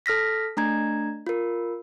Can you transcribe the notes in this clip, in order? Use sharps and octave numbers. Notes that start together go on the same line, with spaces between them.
A4 F6 A#6 B6
A3 D4 A#5 G#6
F4 A#4